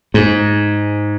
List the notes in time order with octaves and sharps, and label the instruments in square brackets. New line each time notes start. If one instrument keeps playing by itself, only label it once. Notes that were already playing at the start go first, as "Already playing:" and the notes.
[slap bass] G#2